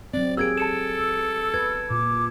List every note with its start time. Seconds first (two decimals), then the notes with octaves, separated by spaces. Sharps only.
0.14 F#3 C4 D5
0.37 A#3 G4 G#4 E6 G#6 D7
0.58 A4 A5 C#7 E7
0.98 E6
1.54 B4 G#6
1.91 A#2 D6